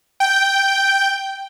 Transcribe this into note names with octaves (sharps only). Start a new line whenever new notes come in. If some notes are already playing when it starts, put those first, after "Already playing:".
G5